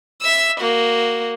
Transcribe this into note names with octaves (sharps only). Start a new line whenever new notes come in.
E5 E6
A#3 F#4